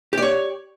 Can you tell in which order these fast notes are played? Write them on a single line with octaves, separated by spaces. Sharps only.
G4 D5 C#5